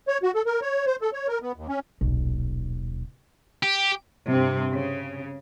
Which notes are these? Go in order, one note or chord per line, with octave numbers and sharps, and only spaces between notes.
C#5
F#4
A4
A#4
C#5
C5
A4
C#5
A#4
B3
D#2
C#4
D#1 B1
G4
G2 C3 C4
C#3